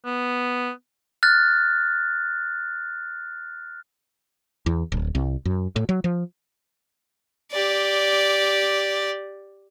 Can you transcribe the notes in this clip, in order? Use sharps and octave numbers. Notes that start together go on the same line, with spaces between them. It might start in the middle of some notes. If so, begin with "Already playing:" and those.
B3
F6 F#6 A6
E2
D1
C2
F#2
A2
F#3
F3
G4 D5